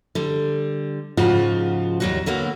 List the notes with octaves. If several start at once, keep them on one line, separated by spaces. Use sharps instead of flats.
D3 G3
G#2 C#3 F3 F4 F#4
D#2 G#2 F#3 G3 F#4
D3 F#3 A#3 B3